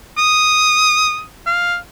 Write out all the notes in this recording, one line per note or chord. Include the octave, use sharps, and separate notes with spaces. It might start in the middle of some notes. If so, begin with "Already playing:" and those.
D#6
F5